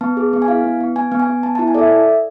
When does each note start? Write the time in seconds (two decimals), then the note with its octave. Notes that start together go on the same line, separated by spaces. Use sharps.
0.01 B3 A5
0.17 G#4
0.33 B3
0.42 G#5
0.48 E4 F5
0.64 B3
0.80 B3
0.96 B3 G#5
1.12 B3
1.20 G#5
1.27 B3
1.43 B3 A5
1.55 A5
1.59 E4
1.68 G#5
1.75 A4 D5 E5